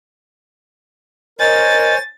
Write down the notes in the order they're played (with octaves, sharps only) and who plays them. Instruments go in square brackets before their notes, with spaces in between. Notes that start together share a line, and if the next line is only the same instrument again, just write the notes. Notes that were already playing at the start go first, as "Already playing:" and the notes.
[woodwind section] A#4 [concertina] C5 C#5 G#5 [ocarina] D#5 [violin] A6